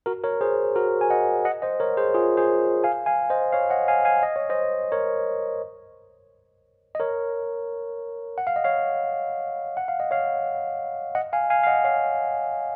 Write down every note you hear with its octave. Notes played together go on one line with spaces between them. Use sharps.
F#4 A#4
A#4 C#5
G#4 C5
F#4 A#4
G#5
D#5 F#5
D#5 F#5
C5 D#5
A#4 C#5
G#4 C5
F4 G#4
G#4 C5
F5 G#5
F5 G#5
C5 D#5
C#5 F5
D#5 F#5
F5 G#5
F5 G#5
D#5
C#5
C5 D#5
A#4 C#5
D#5
A#4 C#5
F#5
F5
D#5
C#5 F5
F#5
F5
D#5
C#5 F5
D#5 F#5
F5 G#5
F5 G#5
F5
D#5 F#5
C#5 F5